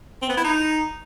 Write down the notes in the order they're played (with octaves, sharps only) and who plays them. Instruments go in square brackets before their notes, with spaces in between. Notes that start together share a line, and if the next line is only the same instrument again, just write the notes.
[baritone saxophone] C4
B3
E4
D#4